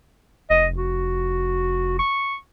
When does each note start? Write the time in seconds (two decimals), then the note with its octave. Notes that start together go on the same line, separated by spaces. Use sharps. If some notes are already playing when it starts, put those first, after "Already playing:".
0.50 F1 D#5
0.77 F#4
1.99 C#6